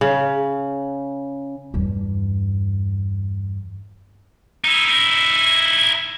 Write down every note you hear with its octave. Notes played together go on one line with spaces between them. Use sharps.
C#3
E2 G2
D#4 E4